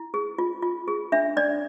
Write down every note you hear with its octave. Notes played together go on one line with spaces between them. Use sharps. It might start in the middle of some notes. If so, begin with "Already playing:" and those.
Already playing: E4
G#4
F4
F4
G#4
D4 E5
D4 D5